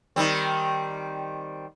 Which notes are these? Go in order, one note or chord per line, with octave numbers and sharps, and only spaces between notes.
D#3 G3 C4